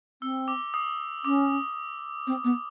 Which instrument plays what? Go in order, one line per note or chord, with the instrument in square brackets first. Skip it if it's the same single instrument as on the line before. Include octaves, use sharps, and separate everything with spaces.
[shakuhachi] C4 [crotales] E6
[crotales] D6
D#6
[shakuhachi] C#4 [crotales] D6
[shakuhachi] C4
B3